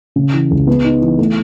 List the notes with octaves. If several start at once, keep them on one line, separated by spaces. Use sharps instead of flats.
C#3
E3
C#2
B3
D#4
E3
A3